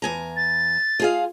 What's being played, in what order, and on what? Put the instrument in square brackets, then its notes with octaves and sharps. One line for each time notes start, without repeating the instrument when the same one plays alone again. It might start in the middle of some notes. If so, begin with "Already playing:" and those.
[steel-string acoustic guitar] E2 G#5 A#5
[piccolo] A6
[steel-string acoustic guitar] F4 G#4 F5